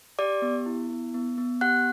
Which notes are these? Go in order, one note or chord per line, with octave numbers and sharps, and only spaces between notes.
G4 D5 D6
B3
E4
B3
B3
B3
G4 F#5 F#6